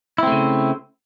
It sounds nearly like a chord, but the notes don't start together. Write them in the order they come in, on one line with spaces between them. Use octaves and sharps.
E4 C4 A3 C#3